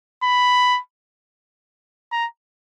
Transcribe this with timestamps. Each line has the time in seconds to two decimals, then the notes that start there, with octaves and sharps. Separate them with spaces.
0.23 B5
2.12 A#5